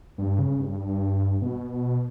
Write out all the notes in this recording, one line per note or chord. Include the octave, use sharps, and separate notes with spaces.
G2
C#3
G2
B2